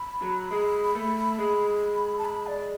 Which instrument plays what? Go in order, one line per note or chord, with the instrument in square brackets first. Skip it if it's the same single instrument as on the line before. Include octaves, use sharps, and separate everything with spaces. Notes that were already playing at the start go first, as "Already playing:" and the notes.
Already playing: [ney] B5
[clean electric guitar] F#3
G#3
A3
G#3
[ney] A5
B5
D5